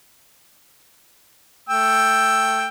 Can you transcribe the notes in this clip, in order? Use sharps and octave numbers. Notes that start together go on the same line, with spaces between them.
A3 G5 E6